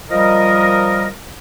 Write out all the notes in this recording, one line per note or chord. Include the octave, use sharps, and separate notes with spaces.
F3 G3 A#4 D#5